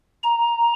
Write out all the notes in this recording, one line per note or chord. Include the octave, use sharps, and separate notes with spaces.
A#5